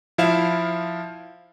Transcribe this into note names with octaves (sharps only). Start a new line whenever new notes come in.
F3 E4 F5 E7